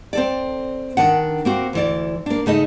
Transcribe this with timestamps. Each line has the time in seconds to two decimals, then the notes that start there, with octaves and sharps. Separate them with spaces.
0.13 C4 A4 D5
0.97 D#3 D4 F#5
1.45 A#3 C4 F#4
1.73 D2 E3 D5
2.26 A#3 D4
2.46 C#3 A3 D#4 D#5